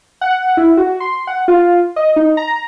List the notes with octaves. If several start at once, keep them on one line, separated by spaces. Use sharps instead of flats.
F#5
E4
F#4
C6
F#5
F4
D#5
D#4
A#5